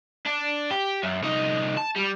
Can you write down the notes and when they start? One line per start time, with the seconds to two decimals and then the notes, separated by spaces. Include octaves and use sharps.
0.26 D4
0.71 G4
1.03 F#2
1.23 C2 D#4
1.77 A5
1.96 G3